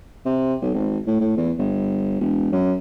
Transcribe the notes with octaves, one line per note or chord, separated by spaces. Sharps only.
C3
B1
G#1
A2
A2
E2
G1
E1
F#2